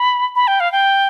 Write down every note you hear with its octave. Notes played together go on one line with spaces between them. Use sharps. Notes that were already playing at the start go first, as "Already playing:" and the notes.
Already playing: B5
B5
G5
F5
G5